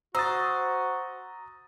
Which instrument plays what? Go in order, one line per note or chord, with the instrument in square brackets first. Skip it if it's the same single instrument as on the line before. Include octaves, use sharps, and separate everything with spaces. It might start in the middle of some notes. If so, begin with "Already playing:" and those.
[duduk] F#4 [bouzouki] C5 [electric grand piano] A#5 D#6 A6 [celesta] E6